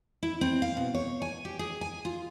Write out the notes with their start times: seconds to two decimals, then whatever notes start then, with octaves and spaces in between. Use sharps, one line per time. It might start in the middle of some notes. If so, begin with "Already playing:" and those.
0.23 E4
0.41 C4
0.62 F5
0.77 B2
0.94 C#5
1.22 G#5
1.45 G4
1.59 G#4
1.81 G#5
2.05 F4